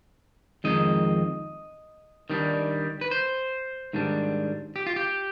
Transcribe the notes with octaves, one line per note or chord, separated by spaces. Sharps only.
F2 D#3 G#3 D#5
D#3 G3 D4
B4
C5
G#2 D#3 G3 D4
G4
F4
G4